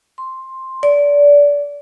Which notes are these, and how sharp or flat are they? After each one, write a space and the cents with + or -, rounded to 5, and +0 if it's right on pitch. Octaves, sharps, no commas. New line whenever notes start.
C6 +10
D5 -25